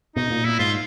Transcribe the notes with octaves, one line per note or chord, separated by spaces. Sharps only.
B2 D#4
A#2
A#2 E4
G#2 F4